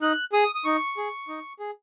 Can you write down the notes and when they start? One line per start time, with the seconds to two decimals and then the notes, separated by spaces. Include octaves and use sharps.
0.01 D#4 F#6
0.33 G#4 D#6
0.55 D#6
0.64 D#4 C#6
0.97 G#4
1.28 D#4
1.60 G#4